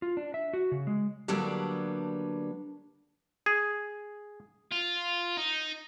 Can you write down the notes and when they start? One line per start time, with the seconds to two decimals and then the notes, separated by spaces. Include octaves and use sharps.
0.02 F4
0.17 D4
0.34 E5
0.53 F#4
0.72 C#3
0.87 G#3
1.28 D3 F#3 G3 A#3 B3 D4
3.46 G#4
4.71 F4
5.37 D#4